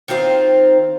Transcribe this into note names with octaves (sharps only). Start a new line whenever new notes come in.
D#3 C4 F4 C5